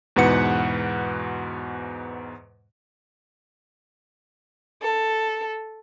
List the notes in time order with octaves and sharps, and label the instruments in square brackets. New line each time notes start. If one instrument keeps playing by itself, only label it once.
[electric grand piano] E2 G#2 B2 B4 F#5 C#7
[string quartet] A4